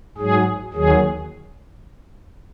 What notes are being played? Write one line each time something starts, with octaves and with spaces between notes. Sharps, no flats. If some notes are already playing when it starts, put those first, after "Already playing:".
G#2 F#3 G#4
D#2 D#3 F#3 G#4